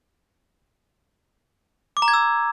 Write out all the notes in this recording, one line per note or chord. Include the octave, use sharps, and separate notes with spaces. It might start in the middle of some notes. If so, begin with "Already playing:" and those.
D6
A#5
G#6
E6